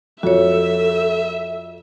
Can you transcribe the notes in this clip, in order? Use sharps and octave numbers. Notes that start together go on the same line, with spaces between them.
F2 F#4 A4 C#5 E5